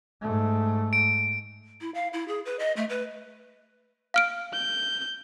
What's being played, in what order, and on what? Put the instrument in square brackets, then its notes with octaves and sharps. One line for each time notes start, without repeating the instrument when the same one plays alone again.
[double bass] G#2 A3
[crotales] D7
[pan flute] E4
F5
E4
G#4
B4
D#5
A3
B4
[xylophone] F5 F6 D7
[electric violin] G6